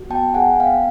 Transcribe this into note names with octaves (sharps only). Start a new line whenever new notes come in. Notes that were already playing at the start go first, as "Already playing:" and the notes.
Already playing: F#4
B3 G5 A5
G#4 F#5 G#5
B3 F5 G5